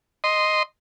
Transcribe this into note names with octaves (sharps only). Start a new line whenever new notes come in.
D#5 C6